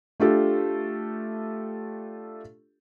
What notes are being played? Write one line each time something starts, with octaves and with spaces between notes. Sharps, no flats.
A3 D4 F4 G4 A4